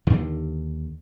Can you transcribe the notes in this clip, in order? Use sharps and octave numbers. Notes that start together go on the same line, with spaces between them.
D#2 D3 D#3